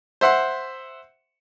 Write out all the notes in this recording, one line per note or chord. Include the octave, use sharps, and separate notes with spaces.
C5 E5 F#5 C6